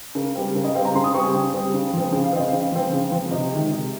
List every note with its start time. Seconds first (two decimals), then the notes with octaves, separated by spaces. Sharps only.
0.15 C#3 A#4
0.35 G3 C4
0.55 C#3 A#4
0.64 D#5
0.74 G3 C4 F5
0.85 A#5
0.94 C#3 C6
1.04 D#6
1.14 G3 C4 C#6
1.24 G#5
1.34 C#3 G5
1.54 G3 C4
1.74 C#3
1.94 F3 C4
2.12 C#3 G5
2.24 F5
2.33 F3 C4 D#5
2.48 C#3 F5
2.72 F3 C4
2.93 C#3
3.12 F3 C4
3.31 C3 D#5
3.51 D#3 G#3
3.71 C3